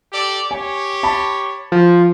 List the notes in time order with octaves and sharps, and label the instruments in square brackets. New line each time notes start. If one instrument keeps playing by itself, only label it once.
[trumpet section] G4 A4 D5
[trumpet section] G4 C#5 [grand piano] G#5
[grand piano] A5 B5
[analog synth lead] F3